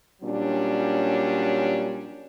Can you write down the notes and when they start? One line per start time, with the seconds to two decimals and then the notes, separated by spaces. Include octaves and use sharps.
0.22 A#2 F#3 G3 C#4 D4